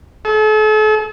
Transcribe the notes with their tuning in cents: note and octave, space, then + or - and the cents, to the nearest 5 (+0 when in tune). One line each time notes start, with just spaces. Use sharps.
A4 -40